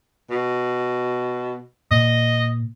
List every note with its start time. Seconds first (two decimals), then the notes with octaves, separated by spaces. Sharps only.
0.31 B2
1.91 A#2 D#5